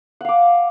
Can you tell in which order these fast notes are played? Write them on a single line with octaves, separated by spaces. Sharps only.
F#5 F5 D6